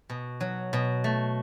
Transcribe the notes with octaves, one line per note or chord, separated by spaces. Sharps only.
B2
F#3
B2
A3